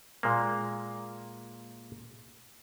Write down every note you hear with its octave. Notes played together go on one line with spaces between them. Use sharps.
A#2 G#3 A#3